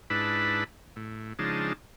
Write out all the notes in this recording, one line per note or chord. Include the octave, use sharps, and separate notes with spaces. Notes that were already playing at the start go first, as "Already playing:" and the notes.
G#2 D4 E4 B4 A5 B5
A2
C#3 F3 G#3 D4 D#4 A5